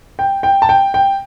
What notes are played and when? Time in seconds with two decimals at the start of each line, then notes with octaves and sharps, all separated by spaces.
0.19 G5
0.43 G5
0.62 A5
0.69 G5
0.94 G5